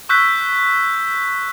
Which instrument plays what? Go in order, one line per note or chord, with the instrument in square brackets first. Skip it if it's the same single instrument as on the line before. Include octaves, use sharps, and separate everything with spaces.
[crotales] C#6 E6 F#6 G6 B6